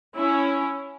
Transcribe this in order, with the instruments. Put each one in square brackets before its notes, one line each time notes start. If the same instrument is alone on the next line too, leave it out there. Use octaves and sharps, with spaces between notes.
[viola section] C#4 E4